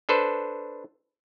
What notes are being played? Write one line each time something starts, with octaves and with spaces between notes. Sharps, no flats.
D4 A4 B4 C5